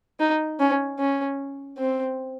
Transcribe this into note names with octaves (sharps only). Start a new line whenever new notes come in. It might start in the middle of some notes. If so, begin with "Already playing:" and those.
D#4
C#4
C#4
C4